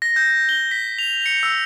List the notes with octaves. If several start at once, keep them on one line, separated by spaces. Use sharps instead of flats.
A#6
G6
G7
B6
F7
C#7
E6